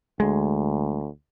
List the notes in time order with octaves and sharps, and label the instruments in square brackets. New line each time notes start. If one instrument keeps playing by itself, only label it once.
[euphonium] D2 [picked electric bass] G#3